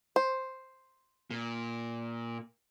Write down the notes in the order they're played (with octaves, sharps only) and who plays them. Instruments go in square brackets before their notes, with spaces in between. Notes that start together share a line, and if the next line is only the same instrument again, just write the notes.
[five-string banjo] C5
[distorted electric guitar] A#2